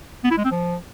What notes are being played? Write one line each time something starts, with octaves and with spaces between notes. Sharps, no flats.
B3
E4
G#3
C4
F3